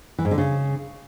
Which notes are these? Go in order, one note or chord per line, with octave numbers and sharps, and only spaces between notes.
E3
G#2
D3
C#3